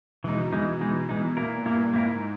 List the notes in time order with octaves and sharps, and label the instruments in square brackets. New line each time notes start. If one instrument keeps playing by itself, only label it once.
[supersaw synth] B2 [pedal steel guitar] E3 G#3 D#4
[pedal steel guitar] E3 G#3 D#4
E3 G#3 D#4
E3 G#3 D#4
[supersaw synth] A#2 [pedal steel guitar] A#3 E4 A#4
[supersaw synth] G2 [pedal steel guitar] A#3 E4 A#4
[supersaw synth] G#2 [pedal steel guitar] A#3 E4 A#4